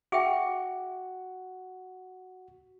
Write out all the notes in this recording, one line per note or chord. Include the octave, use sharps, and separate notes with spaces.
F#4 G#4 E5 G5